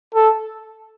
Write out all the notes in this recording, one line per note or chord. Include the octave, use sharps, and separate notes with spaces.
A4